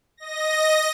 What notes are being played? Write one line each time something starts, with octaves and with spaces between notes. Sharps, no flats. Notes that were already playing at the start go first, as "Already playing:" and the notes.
D#5 A#6